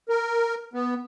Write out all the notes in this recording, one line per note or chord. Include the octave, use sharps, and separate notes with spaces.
A#4
B3